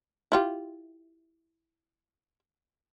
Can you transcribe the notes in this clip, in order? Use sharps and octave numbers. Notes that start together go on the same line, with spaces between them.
E4 F4 G4